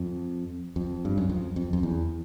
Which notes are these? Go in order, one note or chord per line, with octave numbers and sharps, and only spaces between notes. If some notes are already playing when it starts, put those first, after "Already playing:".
Already playing: F2
F2
G2
F#2
F2
F2
F2
E2